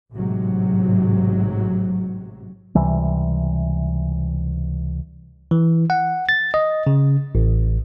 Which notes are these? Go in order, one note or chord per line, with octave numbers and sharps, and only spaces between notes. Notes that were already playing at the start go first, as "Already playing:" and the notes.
A1 G#2 C3 F#3
C#2 C3 E3 G3
E3
F#5
A6
D#5
C#3
A1